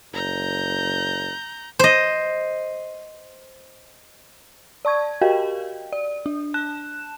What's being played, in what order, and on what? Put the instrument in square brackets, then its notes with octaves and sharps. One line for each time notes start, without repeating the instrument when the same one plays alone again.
[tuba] F#1 [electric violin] A#5 G6
[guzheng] C5 D#5
[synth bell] D5 A5 C#6 G#6
F#4 G4 A#4 D#5 F5 G5
D5
D4
A5 F#6 E7